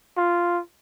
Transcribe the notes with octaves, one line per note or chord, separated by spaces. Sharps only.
F4